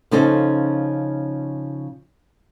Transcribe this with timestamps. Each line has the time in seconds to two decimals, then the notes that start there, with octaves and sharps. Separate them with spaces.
0.11 C#3 F3 C#4 D#4 A4 C5